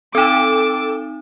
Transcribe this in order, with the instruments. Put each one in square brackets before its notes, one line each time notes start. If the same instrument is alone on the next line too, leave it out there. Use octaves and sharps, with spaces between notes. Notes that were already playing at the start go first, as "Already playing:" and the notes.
[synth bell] C4 D#4 [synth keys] A4 G5 E7 [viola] D6